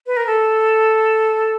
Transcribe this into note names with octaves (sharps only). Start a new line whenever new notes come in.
B4
A#4
A4